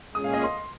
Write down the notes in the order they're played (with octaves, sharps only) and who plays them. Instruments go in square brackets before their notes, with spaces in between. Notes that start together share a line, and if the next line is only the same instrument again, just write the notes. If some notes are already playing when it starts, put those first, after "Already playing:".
[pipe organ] A#2 G#3 C#4 G#4 [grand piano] D#6
[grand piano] F5
D#5
C6